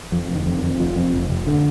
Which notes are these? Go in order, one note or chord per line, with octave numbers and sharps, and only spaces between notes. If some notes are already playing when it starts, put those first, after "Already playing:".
F2 F3
F1
D#3
F2
D#3
F2
F1 F3
F2
F1
F1
D3